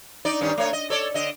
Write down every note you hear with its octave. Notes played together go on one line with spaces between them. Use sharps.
D#4 D5
G2 D#3 C#4
A3 C#5
D#5
A4 C#5 D5
D3 D#5